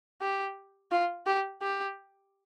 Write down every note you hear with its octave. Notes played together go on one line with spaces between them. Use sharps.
G4
F4
G4
G4